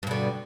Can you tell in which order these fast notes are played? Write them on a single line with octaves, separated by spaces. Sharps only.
G2 B2 D3